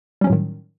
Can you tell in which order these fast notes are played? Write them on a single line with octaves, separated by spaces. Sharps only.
G3 C#4 F#3 A2 D#3